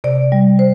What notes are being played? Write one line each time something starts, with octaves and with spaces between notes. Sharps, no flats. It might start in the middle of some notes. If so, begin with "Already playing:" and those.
C3 D5
G3
C5